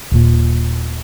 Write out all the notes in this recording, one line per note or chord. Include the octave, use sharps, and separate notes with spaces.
D#1 A#2